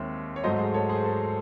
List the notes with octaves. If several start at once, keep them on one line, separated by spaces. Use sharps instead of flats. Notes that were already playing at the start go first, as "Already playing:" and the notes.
Already playing: D#2 D#3 G#3 C4 C#5 E5
C#5
G#2 F#3 A3 C5 D#5
G#4 C5
A4 C#5
G#4 C5
A4